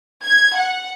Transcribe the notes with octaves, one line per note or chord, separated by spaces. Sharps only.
G#6
F#5